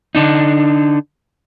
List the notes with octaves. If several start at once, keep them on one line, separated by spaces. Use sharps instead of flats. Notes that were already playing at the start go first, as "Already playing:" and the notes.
D3 D4 D#4